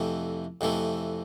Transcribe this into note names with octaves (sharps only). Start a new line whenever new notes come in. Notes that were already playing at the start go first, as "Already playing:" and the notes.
Already playing: F2 C3 E3 A3
F2 C3 E3 A3